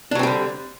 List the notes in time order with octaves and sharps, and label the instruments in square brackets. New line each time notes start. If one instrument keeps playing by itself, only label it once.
[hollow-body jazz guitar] D4
F#3
C4
G3
D3